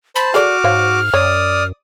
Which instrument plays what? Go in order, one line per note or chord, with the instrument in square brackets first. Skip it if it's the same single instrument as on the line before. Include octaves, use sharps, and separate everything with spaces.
[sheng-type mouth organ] C5 A5 [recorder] B5
[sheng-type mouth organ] F#4 D6 [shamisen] G#4 A4 D5 [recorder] F6
[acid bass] G#2 [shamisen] C5 C#5 F5
[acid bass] F#2 [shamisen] C#5 [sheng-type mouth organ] D5 D#6